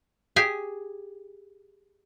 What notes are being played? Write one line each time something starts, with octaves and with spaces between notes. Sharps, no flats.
G4 G#4 G#5